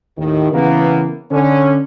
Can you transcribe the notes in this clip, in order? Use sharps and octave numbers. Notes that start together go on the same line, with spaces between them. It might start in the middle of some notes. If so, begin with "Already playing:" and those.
D#2 A2 D#3
C#3 E3 A#3 B3
D3 C#4